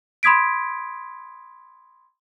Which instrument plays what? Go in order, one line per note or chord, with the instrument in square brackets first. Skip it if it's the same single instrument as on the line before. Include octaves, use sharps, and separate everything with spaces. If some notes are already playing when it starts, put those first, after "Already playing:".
[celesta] B5 C6 D#6 G#6 B6 D7